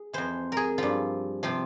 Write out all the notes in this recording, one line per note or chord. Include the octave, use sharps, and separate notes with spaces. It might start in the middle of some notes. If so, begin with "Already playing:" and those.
Already playing: G#4
F2 E3 C5
G#4 A#4
G2 F3 F4
C3 F3 F4